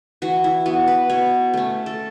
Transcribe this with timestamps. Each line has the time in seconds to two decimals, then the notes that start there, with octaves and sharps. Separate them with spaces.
0.22 E3 F#4
0.44 E4
0.66 B3 F#4
0.88 B4
1.10 B2 C#5
1.53 A3 C#4
1.86 A4